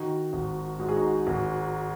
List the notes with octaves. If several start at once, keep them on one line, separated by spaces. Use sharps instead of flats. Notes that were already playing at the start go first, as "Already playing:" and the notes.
Already playing: D#3 D#4 F#4
G#1
G#2 F#4
G#4
D#4 F#4
G#1